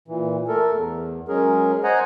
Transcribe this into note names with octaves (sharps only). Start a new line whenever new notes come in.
A#2 E3
A3 A4 A#4
E2
F#3 G#3 C#4 G#4 A#4
C5 D#5 F#5 G#5 A#5